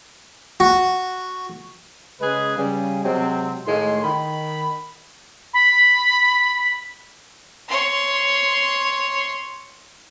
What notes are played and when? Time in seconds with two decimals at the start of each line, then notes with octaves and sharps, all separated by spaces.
0.60 F#4
2.21 C#3 G#3 G#4 B4
2.58 C#3 G3 G#4
3.05 C3 F#3 G#3 C4
3.66 A2 D#3 G#3 A3 F4 C6
4.04 D#3 B5
5.54 B5
7.69 C#5 C6